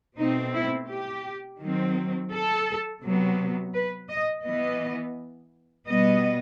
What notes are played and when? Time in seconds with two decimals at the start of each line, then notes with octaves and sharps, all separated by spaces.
0.18 B2 A3 C4 D#4
0.54 E4
0.89 G4
1.60 D#3 F#3 C4
2.32 A4
3.03 C3 F#3 B3
3.74 B4
4.09 D#5
4.44 E3 B3 D#5
5.87 B2 G3 B3 D#5